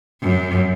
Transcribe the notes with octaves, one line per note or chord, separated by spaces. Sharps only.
F#2